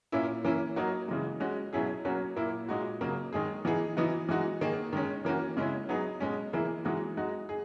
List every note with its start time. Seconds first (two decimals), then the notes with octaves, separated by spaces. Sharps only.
0.12 A#2 A#3 C#4 E4
0.45 E3 A#3 C#4 E4
0.76 F#3 A#3 D#4 F#4
1.08 C#3 E3 G#3
1.40 G#3 C#4 F#4
1.73 B2 F#3 C#4 E4 G#4
2.05 F#3 A#3 C#4 F#4
2.37 A#2 A#3 E4
2.69 A#2 G#3 D#4 F#4
3.01 C#3 F#3 A#3
3.33 D#3 G#3 D#4 G#4
3.65 E3 B3 D#4 G#4
3.97 E3 B3 D#4 F#4
4.29 E3 G#3 D#4 F#4
4.61 D#3 A#3 D#4 G#4
4.93 D#3 G#3 C#4
5.25 E3 A#3 C#4 F#4
5.57 C#3 G#3 C#4 E4
5.89 F#3 B3 D#4 G#4
6.20 B2 G#3 C#4
6.53 E3 A#3 E4 G#4
6.85 E3 G#3 D#4 F#4
7.17 G#3 D#4 F#4
7.49 G#4